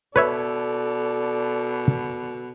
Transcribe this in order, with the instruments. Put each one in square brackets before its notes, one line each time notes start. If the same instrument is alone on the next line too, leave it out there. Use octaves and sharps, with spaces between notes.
[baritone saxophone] B2 [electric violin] A4 D5 [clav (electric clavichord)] B4 C#5 E5